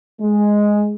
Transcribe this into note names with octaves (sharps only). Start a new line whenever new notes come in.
G#3